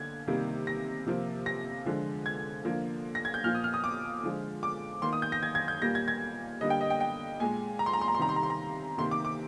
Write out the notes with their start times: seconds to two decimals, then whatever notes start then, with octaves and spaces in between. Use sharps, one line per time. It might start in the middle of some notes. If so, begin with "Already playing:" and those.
Already playing: D3 A#3 G#6
0.27 C3 D#3 G3 A#3
0.67 A#6
1.06 C3 F3 A#3
1.46 A#6
1.86 D3 F3 G#3
2.26 G#6
2.65 D3 F3 A#3
3.15 A#6
3.25 G#6
3.34 G6
3.44 A#2 F3 A#3 F6
3.55 D#6
3.64 F6
3.74 D#6
3.84 D6
4.23 D3 F3 G#3
4.63 D6
5.02 D#3 A#3 C6
5.13 D#6
5.22 G6
5.32 A#6
5.43 G#6
5.55 G#6
5.68 G6
5.82 A#2 G3 A#3 A#6
5.95 G#6
6.08 G#6
6.61 D3 G3 A#3 D#5
6.70 G5
6.81 D#5
6.90 G5
7.01 G5
7.40 A#2 G#3 G#5
7.79 A#5
7.86 C6
7.93 A#5
8.01 C6
8.08 A#5
8.15 C6
8.19 C3 D#3 G3 A#5
8.29 C6
8.36 A#5
8.43 C6
8.50 A#5
8.98 C3 D#3 A#3 C6
9.11 D6
9.25 D6